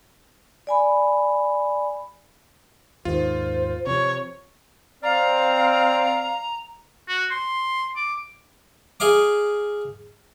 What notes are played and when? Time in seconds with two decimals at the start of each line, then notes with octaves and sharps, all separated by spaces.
0.67 D5 G#5 B5
3.05 D#2 G#2 D#3 F4 C5
3.87 C3 F3 C#5
5.03 C4 D5 F5 A#5
7.08 F#4
7.31 C6
7.97 D6
9.00 G#4 D#5 F5 D6